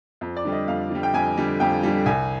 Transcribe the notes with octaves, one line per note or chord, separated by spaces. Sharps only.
F2
D5
D3 G3
D#5
F2 F5
D3 G3
G5
F2 G#5
D3 G3
F2 G5
D3 G3
C2 G#5